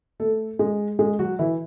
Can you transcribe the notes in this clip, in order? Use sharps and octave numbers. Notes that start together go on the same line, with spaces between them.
A3 A4
G#3 G#4
G#3 G#4
F#3 F#4
E3 E4